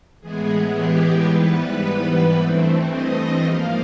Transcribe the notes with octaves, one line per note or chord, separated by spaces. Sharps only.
A2 E3 G#3 B3 G#4
G4
G#2 E3 G3 B3 B4
G2 E3 A3 C4
D#5
G#2 F3 A#3 F5